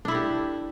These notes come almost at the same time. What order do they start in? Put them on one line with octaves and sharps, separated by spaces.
D4 E4 A4 G4